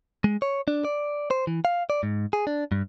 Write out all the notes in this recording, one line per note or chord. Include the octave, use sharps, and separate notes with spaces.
G#3
C#5
D4
D5
C5
E3
F5
D5
G#2
G#4
D4
G2